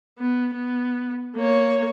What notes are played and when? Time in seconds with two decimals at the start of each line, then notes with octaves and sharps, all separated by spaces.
0.19 B3
0.54 B3
1.36 A#3 C#5